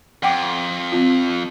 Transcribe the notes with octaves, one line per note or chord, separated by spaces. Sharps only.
F2 F#5 G5 D6
C4 F4